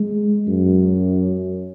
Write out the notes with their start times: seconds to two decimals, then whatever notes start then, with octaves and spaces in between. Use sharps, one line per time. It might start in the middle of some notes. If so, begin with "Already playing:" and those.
Already playing: G#3
0.48 F#2